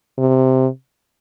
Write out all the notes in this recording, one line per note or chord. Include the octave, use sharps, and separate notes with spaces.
C3